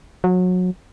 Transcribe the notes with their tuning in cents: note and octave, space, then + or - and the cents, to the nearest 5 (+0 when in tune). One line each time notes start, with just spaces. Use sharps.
F#3 -25